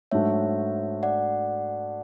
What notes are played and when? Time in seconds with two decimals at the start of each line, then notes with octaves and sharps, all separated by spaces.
0.11 G#2 F#3 A3 D4 A4 C#5 E5
1.03 D5 F#5